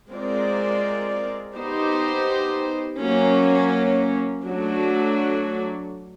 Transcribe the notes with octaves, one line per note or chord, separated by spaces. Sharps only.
G#3 C4 F4 A#4 D5
B3 D#4 G4 C5
F#3 A#3 C#4
F#3 A3 D4 F#4